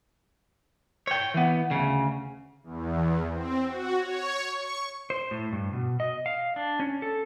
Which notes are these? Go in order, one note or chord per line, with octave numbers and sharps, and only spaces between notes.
C#5 G5
E3 B3
D2 C#3
E2
C4
F#4
C#5
C#6
C5
A2
G2
B2
D#5
F5
D4
C#4
A4